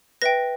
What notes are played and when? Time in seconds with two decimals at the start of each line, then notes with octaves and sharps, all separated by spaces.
0.22 B4 E5 G5 A#6